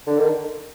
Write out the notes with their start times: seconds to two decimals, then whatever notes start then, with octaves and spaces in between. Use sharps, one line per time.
0.07 D3
0.18 D#3